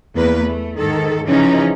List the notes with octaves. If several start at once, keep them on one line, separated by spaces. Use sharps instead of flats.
E2 A#3 B4
A3
G#2 D#3 A4
C#3 E3 F3 C#4 D#4